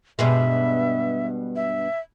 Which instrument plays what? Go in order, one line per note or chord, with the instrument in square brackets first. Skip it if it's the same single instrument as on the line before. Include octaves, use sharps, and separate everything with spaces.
[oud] G2 B2 G#3 [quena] E5
[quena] E5